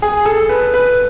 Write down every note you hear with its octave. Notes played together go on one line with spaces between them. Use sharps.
G#4
A4
B4
B4